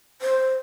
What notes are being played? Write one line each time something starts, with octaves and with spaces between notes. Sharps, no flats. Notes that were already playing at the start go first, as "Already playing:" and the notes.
C5